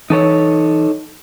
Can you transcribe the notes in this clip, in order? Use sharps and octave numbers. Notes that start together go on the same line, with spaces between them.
E3 D#4 A4 C#5